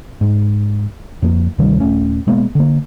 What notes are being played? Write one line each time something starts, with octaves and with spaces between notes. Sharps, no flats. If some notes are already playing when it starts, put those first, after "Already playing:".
G#2
F2 F3 A#3
D2 C3 D#3 G3
D#1 A3 C#4
B2 G#3 A#3 B3
D3 A#3